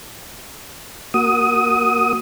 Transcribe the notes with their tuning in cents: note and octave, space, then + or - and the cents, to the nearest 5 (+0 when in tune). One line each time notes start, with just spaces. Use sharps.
A#3 +0 F#4 +0 D#6 +15